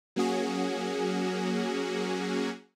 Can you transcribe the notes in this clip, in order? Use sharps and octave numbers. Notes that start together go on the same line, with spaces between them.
F#3 A#3 C#4 F#4 G#4